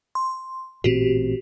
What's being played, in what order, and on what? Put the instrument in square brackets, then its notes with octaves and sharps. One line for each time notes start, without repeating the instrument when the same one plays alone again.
[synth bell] C6
[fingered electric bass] A1 A#2 C4 [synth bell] F#4 G4